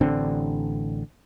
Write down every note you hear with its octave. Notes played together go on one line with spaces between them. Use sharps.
A1 D3 C4 D4